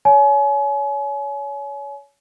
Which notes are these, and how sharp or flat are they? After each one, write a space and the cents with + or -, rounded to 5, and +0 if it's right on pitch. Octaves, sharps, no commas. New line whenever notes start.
C#5 +25 G#5 +35